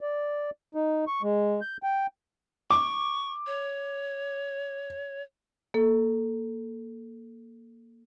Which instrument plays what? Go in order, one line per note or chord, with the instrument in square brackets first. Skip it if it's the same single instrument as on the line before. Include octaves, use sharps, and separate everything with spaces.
[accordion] D5
D#4
C#6
G#3
G6
G5
[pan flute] C#6 [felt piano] D6
[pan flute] C#5
[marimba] A#3 A4